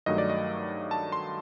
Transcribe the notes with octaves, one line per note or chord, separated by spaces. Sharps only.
G2 D#3 F#3 A3 D#5
D5
D#5
A5
C6